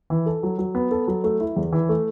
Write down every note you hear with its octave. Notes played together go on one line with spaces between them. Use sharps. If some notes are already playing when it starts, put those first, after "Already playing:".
E3
A4
F#3
F#3
B3
A4
F#3
A3
E4
E2
E3
A3